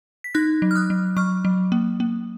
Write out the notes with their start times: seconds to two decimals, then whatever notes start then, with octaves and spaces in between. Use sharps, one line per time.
0.24 B6
0.34 D#4 F#6 A#6
0.62 F#3
0.71 F6
0.75 D#6 F#6
0.90 F#3
1.17 F#3 C#6 F6
1.45 F#3
1.72 A#3
2.00 A#3